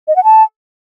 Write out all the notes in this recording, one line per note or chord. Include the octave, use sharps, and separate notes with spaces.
D#5
F#5
A5